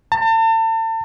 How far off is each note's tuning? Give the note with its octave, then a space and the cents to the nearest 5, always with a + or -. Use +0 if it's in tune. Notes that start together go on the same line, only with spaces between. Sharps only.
A5 +40